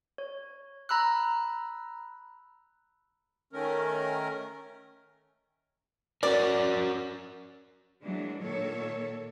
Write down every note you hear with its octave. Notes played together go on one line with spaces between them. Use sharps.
C#5
A#5 B5 E6 F#6
D#3 A3 C#4 A#4
C#4 F#4 A#4 D5
E3 F#3 G#3 A#3 D4
A#2 D#3 A#3 A4 C#5